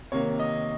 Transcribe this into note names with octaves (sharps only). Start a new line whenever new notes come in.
C3 D#3 A#3 C#5
D#5